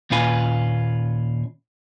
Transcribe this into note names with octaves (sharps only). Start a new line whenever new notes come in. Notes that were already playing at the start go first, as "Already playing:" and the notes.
D#2 A#2 C#4 F4 B4 G#5